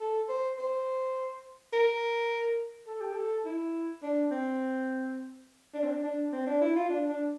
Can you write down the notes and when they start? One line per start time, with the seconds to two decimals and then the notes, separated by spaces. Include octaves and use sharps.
0.01 A4
0.29 C5
0.59 C5
1.73 A#4
2.87 A4
3.01 G4
3.13 A4
3.45 E4
4.03 D4
4.31 C4
5.74 D4
5.83 C4
5.90 D4
6.04 D4
6.33 C4
6.47 D4
6.61 E4
6.76 F4
6.90 D4
7.09 D4